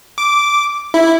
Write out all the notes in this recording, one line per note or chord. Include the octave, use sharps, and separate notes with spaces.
D6
E4